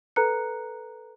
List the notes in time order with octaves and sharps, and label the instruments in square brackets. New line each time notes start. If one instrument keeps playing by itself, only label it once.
[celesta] A4 B4 A#5 F#6 C#7